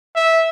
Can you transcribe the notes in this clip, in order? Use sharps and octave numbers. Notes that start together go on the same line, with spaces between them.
E5